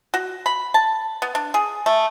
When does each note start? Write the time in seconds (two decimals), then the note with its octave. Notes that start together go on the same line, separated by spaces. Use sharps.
0.14 F#4
0.46 B5
0.74 A5
1.22 B3
1.35 D4
1.54 G#4
1.86 A3